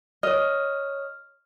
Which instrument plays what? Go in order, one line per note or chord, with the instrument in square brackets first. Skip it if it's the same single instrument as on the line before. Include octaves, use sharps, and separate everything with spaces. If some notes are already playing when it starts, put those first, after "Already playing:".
[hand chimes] C#5 F6 [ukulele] D#5